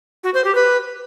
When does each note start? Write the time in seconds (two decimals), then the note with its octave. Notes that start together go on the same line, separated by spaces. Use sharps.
0.24 F#4
0.34 C5
0.44 G4
0.55 B4